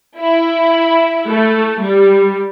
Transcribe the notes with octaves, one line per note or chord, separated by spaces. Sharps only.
E4
A3
G3